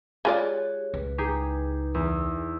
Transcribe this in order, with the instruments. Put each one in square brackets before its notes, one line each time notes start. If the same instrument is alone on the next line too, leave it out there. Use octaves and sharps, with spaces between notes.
[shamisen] G#3 F4 D5 [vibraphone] G4 G#4 C#5 [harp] F#6
[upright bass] C#2 [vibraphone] B4
[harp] D#4 G4 G#4
[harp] E2 [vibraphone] E6